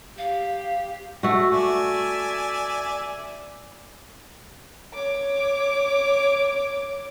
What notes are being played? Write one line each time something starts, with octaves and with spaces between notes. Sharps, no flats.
G4 F5
A3 F#4
D5 E5 G#5
C#5 D6